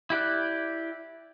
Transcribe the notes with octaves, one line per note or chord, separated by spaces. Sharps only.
E4 G4 D5 F#6